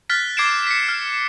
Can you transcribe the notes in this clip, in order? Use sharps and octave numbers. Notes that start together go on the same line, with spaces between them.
F6 F#6 A6 B6
D6 G#6 C7 D7 E7
B6 C#7
F6